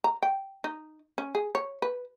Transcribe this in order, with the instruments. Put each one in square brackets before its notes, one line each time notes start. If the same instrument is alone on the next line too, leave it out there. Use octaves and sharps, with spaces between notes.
[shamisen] A#5
G5
D#4
C#4
G#4
C#5
B4